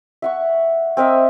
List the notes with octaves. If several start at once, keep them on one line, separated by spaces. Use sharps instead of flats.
E5 F#5 C#6
C4 A#4 D#5 E5